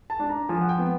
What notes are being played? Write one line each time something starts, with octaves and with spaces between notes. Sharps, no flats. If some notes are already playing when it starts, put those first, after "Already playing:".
A5
D4
A#5
F3 G#5
F#5
G5
B3